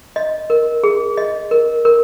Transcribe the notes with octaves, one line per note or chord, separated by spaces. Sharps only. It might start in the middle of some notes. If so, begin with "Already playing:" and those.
D#5
A#4
G#4
D#5
A#4
A#4